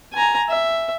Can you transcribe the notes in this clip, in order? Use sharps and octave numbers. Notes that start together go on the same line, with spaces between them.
G#5 A#5
E5